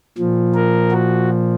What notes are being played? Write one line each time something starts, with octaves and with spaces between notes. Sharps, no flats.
A#2 F3
A#4
F#4